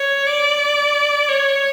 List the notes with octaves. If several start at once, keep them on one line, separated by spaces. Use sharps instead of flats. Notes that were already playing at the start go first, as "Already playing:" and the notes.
Already playing: C#5
D5
C#5